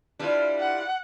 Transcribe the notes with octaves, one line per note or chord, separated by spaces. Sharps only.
G3 D4 E4 F4 B4
F#5